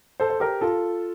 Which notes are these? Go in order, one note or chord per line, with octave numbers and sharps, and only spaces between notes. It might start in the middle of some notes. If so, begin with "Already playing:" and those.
A4 C5
C5
G4 A#4
F4 A4